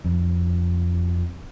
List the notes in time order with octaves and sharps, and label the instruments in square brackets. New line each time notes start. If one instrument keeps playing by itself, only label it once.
[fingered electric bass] F2